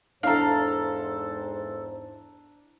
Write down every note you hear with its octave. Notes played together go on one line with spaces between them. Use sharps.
E2 G#2 D4 E4 A4 C5 F5 A#5